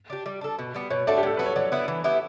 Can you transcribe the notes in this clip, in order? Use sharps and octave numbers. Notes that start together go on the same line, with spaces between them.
D4 G4
G3
D4 A4
B2
G3 B3
B2 C#5
A3 D4 F#4 D5
G4
A2 A4
F#3 B3 F#4 B4
C#5
F#3 D5
B3 E4 B4
E3
B3 E4 G4